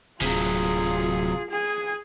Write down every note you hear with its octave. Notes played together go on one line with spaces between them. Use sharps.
D1 C3 F#3 F4 G#4
G#4 G#5